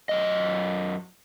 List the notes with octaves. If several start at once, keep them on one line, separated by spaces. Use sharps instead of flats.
F#2 D#5